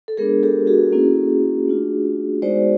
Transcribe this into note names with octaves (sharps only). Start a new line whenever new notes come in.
A4
G#3 B3 D4 G#4 A#4
G4 A4
F#4 G#4
A#3 C#4 E4
A3 D4 F4
G#3 B3 D#4 F#4 C5 D5